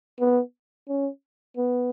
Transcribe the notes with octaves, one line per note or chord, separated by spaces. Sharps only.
B3
C#4
B3